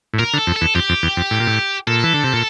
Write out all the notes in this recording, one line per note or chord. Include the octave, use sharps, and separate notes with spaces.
A2
A#2 A#4
D3
A4
F2
A4
E2
F2 G4
F2
E2
F2
A2
A#2
A2
A#2 A4
E3
D3
C3
A#2